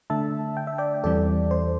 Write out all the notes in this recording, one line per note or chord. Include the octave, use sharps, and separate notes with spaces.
D3 A3 D4 E5 A5
G5
E5
D5 G5
E2 E3 G3 C4 A4 D5
C5